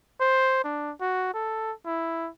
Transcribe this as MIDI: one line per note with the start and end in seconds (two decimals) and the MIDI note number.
0.20 0.60 72
0.64 0.92 62
1.01 1.30 66
1.34 1.72 69
1.86 2.29 64